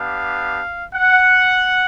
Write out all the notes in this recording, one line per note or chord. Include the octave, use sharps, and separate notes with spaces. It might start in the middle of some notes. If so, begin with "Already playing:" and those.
Already playing: B3 D4 G4 F5
F#5